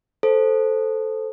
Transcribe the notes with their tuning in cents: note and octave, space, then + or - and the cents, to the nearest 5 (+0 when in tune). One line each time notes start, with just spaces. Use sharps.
A4 +0 C5 +0